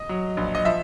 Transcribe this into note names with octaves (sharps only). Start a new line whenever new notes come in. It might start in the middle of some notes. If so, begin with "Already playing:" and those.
Already playing: D#5
F#3
A#1
D#5
F3 E5